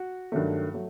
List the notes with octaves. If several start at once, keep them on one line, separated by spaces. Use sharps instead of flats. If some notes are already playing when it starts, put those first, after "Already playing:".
Already playing: F#4
G2 D#3 F#3 A3
F#3 A3